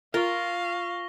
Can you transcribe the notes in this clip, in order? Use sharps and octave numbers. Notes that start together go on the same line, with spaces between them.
F4 A#4 F5 C#6 A#6 G7